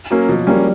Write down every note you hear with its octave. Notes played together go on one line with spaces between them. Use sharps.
F#3 A#3 C#4
B2 F3
F#3 G3 A#3 C#4